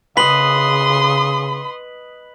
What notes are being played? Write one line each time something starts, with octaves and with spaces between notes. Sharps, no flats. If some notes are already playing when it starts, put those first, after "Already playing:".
C#3 B4 D#5 C6 D#6 B6 F#7